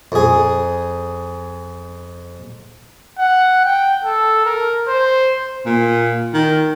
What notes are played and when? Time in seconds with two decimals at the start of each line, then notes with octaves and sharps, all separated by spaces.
0.12 F2 G#4
3.19 F#5
3.65 G5
4.04 A4
4.46 A#4
4.88 C5
5.65 A#2
6.34 D#3